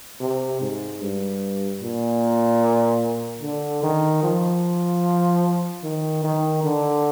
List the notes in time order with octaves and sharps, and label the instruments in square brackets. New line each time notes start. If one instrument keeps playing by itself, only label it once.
[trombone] C3
G#2
G2
A#2
D3
D#3
F3
D#3
D#3
D3